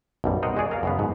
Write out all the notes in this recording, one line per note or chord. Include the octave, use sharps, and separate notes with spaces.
B1 F#2 G3
A#4 C5 D5 D#5 F#5
G#3 F#4 G#4 D5
A#4 F5
F#2 C#3 B3
G#2 B2